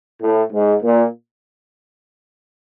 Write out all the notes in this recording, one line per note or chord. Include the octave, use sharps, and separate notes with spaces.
A2
G#2
A#2